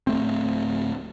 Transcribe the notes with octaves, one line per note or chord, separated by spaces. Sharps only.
D1 A3 C4